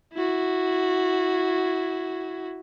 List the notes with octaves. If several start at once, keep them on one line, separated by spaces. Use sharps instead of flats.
E4 F#4